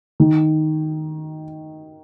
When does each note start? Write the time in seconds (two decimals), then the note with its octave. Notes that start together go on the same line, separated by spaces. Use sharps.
0.20 D#3